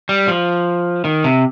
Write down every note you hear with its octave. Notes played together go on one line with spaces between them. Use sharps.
G3
F3
D#3
C3